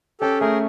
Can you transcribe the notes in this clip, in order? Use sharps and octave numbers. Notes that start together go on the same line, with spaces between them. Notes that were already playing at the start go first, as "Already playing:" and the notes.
C#4 G4 A4
A3 G#4 A#4